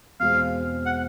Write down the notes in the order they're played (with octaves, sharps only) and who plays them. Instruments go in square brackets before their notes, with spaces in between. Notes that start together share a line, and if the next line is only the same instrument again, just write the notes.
[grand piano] E2 B2 G#3 C4 [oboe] F5
[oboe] F#5